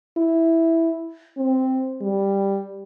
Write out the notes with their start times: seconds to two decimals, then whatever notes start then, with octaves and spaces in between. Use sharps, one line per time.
0.17 E4
1.37 C4
2.02 G3